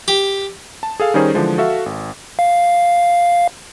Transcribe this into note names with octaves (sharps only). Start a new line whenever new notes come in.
G4
A5
G#4 A4 F5
D#3 G3 C#4 D#4 G#4 C5
D3 E3 F3 G#3
F#4 A4 E5 F5
G#1
F5